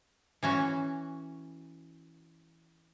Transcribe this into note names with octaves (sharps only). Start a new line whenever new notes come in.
E3 C#4 F#4